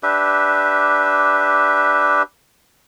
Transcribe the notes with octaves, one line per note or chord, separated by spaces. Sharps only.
D4 G4 B4 E5